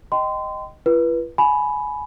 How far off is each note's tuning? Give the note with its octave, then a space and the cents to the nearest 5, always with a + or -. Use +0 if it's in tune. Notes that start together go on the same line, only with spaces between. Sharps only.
D#5 -5 G5 -15 C6 -30
F4 -45 B4 -25
G#5 +20 B5 +0